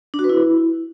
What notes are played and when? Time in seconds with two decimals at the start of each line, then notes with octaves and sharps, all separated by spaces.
0.14 D4
0.19 F#4
0.24 B4
0.29 E4